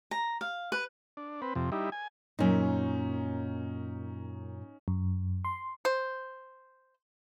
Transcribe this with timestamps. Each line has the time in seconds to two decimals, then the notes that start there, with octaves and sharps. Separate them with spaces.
0.11 A#5
0.41 F5
0.72 B4
1.17 D4
1.42 C4 B4
1.55 F2 C3
1.72 G3 D#4 E4
1.92 G#5
2.39 F#2 A#2 C#4 D#4
4.88 F#2
5.45 C6
5.85 C5